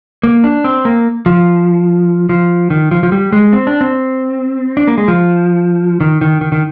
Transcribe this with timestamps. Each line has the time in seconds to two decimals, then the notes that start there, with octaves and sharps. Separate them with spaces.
0.23 A#3
0.44 D4
0.64 C4
0.85 A#3
1.26 F3
2.29 F3
2.70 D#3
2.91 F3
3.03 F3
3.12 G3
3.33 G#3
3.53 C4
3.67 D4
3.81 C4
4.77 D4
4.87 A#3
4.98 G#3
5.08 F3
6.01 D#3
6.21 D#3
6.41 D#3
6.52 D#3